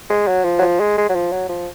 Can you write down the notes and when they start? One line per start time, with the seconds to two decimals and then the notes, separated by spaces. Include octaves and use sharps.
0.10 G#3
0.28 F#3
0.44 F3
0.58 F#3
0.62 F3
0.80 G#3
0.98 G#3
1.09 F#3
1.15 F3
1.32 F#3
1.49 F3